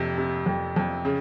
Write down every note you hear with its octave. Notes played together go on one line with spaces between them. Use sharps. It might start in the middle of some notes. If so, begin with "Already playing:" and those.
Already playing: F2 C3
C3
F2
F2
C#3